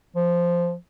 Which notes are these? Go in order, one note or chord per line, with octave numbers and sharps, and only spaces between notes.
F3